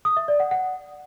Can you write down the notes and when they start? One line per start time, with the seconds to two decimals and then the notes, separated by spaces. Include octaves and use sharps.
0.05 D#6
0.17 E5
0.28 D5
0.40 F#5
0.51 F#5